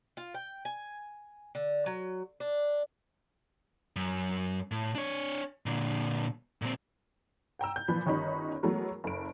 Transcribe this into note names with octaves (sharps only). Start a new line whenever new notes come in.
F4
G5
G#5
D3
F#3
D4
F#2
A2
D4 C#5
A#2 D3
A#2 C4
F#5 G5 A#5 E6
G6
A#2 E3 F3 B4 B5
G1 D#3 C#4 D#4 G4 B5
E3 F#3 G#3 A3 B3 A#4
F#1 A4 D7